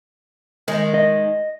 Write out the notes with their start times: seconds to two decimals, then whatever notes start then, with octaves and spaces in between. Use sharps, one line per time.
0.68 D#3 G#3
0.94 D#5